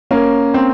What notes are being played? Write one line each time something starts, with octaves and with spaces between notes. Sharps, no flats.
A#3 C#4
C4